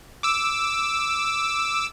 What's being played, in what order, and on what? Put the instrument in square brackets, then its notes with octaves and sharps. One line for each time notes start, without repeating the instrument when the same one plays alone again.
[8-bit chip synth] D6 E6